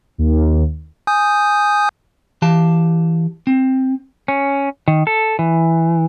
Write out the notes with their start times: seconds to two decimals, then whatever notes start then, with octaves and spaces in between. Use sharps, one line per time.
0.18 D#2
1.07 G#5 D#6 G6
2.42 E3 G4 F5 A5
3.47 C4
4.28 C#4
4.88 D#3
5.07 A4
5.39 E3